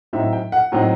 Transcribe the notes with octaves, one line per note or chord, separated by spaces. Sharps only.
A2 F#3 C4 D#4 E5
G5
F#5
A2 F#3 C4 D#4